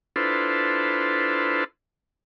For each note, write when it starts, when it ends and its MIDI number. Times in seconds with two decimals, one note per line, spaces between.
0.16 1.64 62
0.16 1.64 64
0.16 1.64 65
0.16 1.64 69
0.16 1.64 71
0.16 1.64 72